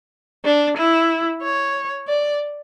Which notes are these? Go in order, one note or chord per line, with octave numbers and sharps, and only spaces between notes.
D4
E4
C#5
D5